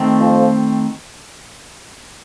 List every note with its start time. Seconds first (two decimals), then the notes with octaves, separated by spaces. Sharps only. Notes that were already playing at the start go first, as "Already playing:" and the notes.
Already playing: D#3 A3 C4
0.20 F2 F3